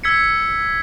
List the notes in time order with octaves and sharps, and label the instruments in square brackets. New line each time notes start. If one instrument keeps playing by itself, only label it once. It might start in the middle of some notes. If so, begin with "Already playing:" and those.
[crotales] E6 G#6 B6 C#7